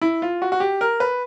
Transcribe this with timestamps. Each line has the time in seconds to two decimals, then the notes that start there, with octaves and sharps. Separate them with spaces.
0.02 E4
0.22 F4
0.42 F#4
0.52 F#4
0.60 G4
0.81 A#4
1.00 B4